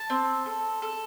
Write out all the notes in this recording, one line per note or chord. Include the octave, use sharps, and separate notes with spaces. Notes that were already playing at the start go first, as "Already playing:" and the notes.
Already playing: A5
C4
A4
A4